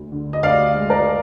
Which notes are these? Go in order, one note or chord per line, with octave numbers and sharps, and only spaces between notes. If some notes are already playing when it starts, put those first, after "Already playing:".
Already playing: D2
D3
D#5
D2 D5 F5
G#3
A#4 D5